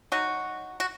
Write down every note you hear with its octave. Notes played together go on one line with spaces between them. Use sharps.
F#3 D#4 F#4
F#4